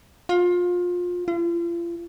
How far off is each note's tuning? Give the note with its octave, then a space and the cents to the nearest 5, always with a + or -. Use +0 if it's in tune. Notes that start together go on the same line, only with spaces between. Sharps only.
F4 +25
F4 -40